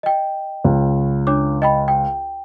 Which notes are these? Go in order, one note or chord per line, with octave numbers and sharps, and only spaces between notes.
D#5 G5
C#2
D4 C#5 D6
D#5 G5 B5
G5